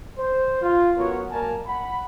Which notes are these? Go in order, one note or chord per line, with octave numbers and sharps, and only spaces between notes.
C5
F4
F#2 B3 F#4 A#4 C#5
F#3 A#3 A#4 D5 G#5 A5
F#5 B5